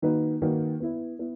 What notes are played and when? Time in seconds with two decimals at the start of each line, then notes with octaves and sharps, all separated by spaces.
0.02 D#3 A#3 D#4 F#4 B4
0.42 D#3 A#3 D#4 F#4 B4
0.80 B3 E4 B4
1.19 B3 E4 B4